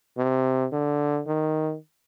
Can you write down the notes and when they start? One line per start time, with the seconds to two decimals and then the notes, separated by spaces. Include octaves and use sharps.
0.17 C3
0.72 D3
1.27 D#3